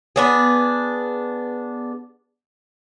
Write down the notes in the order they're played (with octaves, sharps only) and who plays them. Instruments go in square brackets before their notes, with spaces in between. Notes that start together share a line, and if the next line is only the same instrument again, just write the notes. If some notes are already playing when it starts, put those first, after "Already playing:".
[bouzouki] B3 D4 G#4